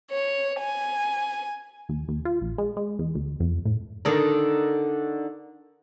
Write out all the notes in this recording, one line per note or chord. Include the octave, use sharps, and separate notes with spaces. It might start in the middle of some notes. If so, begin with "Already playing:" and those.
C#5
G#5
D#2
D#2
F4
A#1
G#3
G#3
E2
D2
F2
A2
D3 D#3 D4